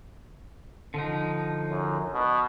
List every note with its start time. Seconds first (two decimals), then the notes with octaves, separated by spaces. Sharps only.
0.94 D3 F3 D#4
1.70 F#2
2.13 B2